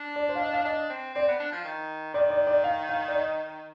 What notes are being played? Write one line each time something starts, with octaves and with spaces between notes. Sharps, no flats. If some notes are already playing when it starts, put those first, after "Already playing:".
Already playing: D4
D5
C5
F5
D#5
F5
D4 D#5
C4
C4 D5
B3
D4
F3
D#3
D#3 D5
D5
D5
F5
F5
D5
D#5